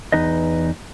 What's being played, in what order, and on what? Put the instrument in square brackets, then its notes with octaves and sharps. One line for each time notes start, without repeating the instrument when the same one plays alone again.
[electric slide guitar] E2 D#4 B4 D#5